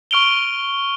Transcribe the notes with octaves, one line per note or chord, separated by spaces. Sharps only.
C#6 F6 D7 F7 G7